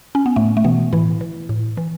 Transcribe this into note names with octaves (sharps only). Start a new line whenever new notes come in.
C#4
B3
A2 A3
A3
B2 E3 B3
A2 E3 E4
E3
A2
E3